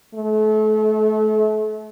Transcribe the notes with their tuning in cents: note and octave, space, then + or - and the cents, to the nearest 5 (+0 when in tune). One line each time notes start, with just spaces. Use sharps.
A3 -35